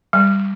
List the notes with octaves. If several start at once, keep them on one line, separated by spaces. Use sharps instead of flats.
G3